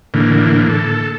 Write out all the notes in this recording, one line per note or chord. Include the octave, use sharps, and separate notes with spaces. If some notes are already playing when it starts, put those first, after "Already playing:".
A2 D3 E3 A#3
A4